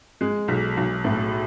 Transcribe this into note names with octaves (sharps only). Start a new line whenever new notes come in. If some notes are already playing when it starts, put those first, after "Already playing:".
G#3
B1
B1
A2